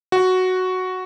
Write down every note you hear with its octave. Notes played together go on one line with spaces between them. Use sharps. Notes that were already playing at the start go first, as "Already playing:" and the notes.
F#4